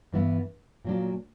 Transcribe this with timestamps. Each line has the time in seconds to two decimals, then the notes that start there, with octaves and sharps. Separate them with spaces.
0.12 G2 E3 B3 E4
0.84 A#2 F#3 A#3 D4